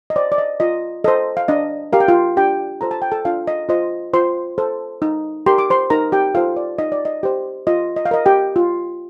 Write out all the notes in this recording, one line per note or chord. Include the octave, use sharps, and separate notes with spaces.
D#5
C5 D5
D5
D#5
F4 D#5
A4 C5 D#5
F5
D4 D#5
G4 A#4 F5
G5
F4 F5
D4 G4 G5
F4 A4 C5 A#5
A5
G5
A4 A5
D4 F4 F5
D#5
F4 C5 D#5
F4 C5 C6
A4 C5
D#4
G4 A#4 C6
D6
C5 C6
D#4 A#4 A#5
G4 G5
F4 A4 C5 F5
D5
D#4 D#5
D5
D#5
G4 C5
F4 D#5
D#5
F5
A#4 D#5
G4 G5
F4